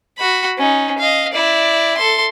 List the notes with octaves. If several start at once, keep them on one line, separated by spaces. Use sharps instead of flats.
F#4 B5
C#4 D#4
D#5 F5
E4 D5
A4 C6